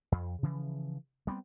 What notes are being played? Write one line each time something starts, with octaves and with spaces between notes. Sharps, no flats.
F2
C#3 E3 F3
G3 B3 C4